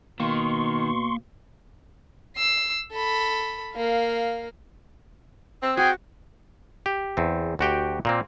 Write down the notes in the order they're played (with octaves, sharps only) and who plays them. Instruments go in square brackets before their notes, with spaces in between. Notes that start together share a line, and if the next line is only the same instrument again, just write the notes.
[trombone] B2 [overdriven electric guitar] D#3 [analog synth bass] A#3 [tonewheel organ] C6 C#6
[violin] E6 C7
A4 B5
A#3 F5
[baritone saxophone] C4 [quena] E6
[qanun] F#4 [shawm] G#4 [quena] G5
[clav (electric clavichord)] G4
E2 C4
D2 F#4 G4 G5
A#2 A#3 C4